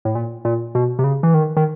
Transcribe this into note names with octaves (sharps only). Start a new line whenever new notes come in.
A2
A#2
A#2
B2
C3
C#3
E3
D#3
D#3